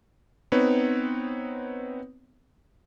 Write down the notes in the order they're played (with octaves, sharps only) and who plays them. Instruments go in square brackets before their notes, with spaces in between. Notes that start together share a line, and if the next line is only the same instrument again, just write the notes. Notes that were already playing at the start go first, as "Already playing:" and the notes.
[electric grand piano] B3 C4 D#4 B4 C#5